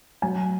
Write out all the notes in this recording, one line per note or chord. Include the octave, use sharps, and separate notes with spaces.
F#3 G#5